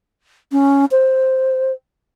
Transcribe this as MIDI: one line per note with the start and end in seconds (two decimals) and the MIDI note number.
0.52 0.85 61
0.91 1.72 72